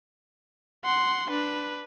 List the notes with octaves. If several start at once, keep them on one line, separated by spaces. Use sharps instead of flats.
F#5 C6
D4 B4